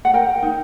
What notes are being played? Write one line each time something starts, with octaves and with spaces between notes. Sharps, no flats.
F#5
A#4 G5
D#4